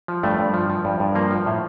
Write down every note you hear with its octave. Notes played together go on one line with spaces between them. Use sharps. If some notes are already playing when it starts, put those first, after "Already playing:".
F3
G2 A3
G2
F3
F3
G2
G2
F3 A#3
F3
A2